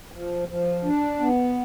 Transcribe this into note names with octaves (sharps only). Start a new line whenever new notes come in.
F3
F3
D4
B3